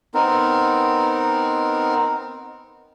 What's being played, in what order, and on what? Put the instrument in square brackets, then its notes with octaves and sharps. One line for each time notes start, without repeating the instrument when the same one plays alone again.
[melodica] B3 C4 D#4 A#4